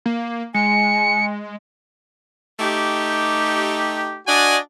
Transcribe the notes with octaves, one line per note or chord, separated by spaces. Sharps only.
A#3
G#3 G#5 C#7
A3 D#4 G4
D4 F#4 D5 D#5 G#5